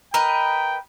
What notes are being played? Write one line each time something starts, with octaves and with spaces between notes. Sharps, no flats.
A#4 B4 D#5 G5 A#5